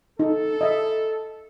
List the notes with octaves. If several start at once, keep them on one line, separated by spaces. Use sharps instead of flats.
D#4 A4
D#5 E5